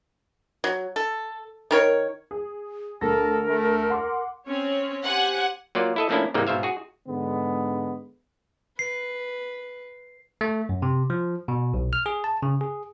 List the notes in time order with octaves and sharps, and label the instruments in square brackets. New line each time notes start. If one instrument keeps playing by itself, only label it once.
[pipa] F#3
A4
D#3 A#4 C#5
[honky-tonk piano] G#4
[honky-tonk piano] D2 A#6 [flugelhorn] A4 [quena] A#4
[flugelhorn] A3
[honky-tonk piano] F#5 C6 D6
[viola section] C4 C#4 C#5
[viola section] G4 C5 G#5 [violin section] F#5
[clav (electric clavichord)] F#3 A#3 F4 D5
E4 A4 D#5
F3 A3 A#3 C#4 D4 E4
G#2 C3 E3 G3 G#3 A#3
G#2 B2 C5 E5 F5
F#4 G#4
[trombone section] G#2 D3 G#3 B3
[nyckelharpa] B4 [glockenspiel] C7
[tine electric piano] A3
F#2
C3
F3
B2
B1
F6
G#4
A5
C#3
G#4